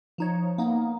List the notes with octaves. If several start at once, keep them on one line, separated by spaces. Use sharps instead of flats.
F3 D#4 C#5
A#3 B3 D#4